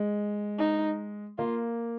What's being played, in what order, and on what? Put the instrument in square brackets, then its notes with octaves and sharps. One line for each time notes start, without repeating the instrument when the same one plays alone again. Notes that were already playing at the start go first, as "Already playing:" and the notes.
Already playing: [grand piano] G#3
[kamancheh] D#4
[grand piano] A#3 [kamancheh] F4